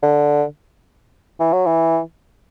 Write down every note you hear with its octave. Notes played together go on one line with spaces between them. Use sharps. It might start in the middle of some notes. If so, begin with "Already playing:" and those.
D3
E3
F#3
E3